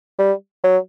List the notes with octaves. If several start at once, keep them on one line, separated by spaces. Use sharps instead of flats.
G3
F#3